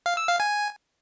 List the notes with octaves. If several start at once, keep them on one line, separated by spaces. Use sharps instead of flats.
F5
E6
F5
G#5